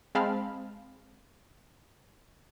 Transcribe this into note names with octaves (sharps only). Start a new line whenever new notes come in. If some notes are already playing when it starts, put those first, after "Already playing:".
G#3 C4 F5 A5 B5 F6